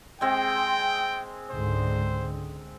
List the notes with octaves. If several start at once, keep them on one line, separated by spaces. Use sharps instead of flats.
G#3 C4 G#4 G5
C#2 G#2 D3 C5